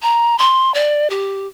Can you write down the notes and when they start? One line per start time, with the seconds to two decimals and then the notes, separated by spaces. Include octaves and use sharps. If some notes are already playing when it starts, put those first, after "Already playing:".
0.02 A#5
0.38 C6
0.74 D5
1.10 G4